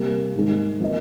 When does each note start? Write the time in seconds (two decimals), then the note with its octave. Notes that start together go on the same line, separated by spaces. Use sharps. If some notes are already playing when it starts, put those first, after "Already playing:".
Already playing: C3 G3 A#3
0.35 G#2 D#3 G#3
0.80 F3 A#3 F4 A#4 D#5